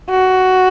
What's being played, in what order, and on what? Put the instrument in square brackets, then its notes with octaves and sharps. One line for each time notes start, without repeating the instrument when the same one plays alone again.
[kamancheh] F#4